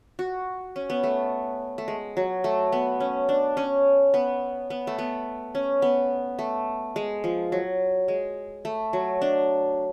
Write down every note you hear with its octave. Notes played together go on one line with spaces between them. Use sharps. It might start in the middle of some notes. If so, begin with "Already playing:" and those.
F#4
C#4
B3
A3
A3
G#3
F#3
A3
B3
C#4
D4
C#4
B3
B3
A3
B3
C#4
B3
A3
G#3
F3
F#3
G#3
A3
F#3
D4